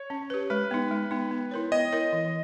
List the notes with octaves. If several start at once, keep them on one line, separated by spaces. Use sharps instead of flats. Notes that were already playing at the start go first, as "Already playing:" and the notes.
Already playing: C#5
C#4
G4 B4
G#3 B4
B3 D#4
G#3
B3 D#4
B3
E4 A#4 C#5
B3 D#5
E4 A#4 C#5
E3